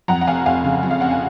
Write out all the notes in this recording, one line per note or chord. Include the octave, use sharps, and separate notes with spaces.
F2 F#5 A#5
F#5
F1 F5 G#5
F1 F5 G#5
C#3
F2
F5
F1 F#5
G#5